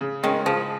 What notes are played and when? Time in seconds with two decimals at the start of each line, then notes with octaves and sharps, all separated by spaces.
0.01 C#3
0.23 D#3 G#3 C#4
0.45 C#3 F3